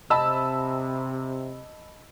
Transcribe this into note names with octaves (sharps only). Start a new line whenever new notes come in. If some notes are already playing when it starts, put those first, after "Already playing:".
C3 D#5 A5 B5 E6